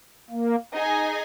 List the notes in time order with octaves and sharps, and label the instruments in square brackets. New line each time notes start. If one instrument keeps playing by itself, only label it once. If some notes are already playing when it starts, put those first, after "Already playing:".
[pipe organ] A#3
[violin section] D#4 G#4 D#5 G#5